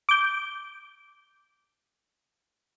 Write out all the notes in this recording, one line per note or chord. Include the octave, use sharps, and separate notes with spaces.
D6 G6